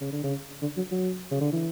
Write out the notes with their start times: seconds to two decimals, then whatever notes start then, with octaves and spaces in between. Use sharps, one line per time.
0.01 C#3
0.12 D3
0.23 C#3
0.62 D3
0.77 F#3
0.91 F#3
1.31 C#3
1.41 D3
1.52 E3